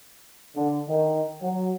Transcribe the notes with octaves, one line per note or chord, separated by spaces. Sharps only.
D3
D#3
F#3